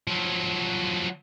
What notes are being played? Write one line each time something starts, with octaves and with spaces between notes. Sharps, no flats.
F3 F#3